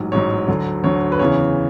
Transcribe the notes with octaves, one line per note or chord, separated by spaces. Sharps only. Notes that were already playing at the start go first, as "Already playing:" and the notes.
Already playing: A1 G#2 F#3
A1 G#2 F#3 C#5
D2 D3 F#3
D2 D3 F#3 C#5
B4
E2 C#3 E3 C#5